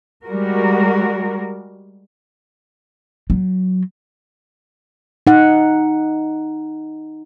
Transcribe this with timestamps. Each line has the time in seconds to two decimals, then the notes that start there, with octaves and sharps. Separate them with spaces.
0.25 G3 G#3 F#4 A#4
3.30 F#3
5.27 D#4 F#5